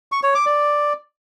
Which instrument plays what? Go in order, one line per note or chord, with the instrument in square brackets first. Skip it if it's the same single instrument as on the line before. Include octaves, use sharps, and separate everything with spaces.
[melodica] C#6
C#5
D6
D5